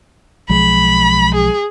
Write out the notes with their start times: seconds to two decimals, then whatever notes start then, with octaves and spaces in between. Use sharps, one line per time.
0.50 B1 F3 G#3 B5
1.34 G#4